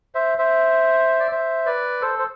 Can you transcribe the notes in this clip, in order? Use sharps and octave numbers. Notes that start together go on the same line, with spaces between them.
C5 E5
C5 E5
D5
C5 E5
B4 D5
A4 C5
C5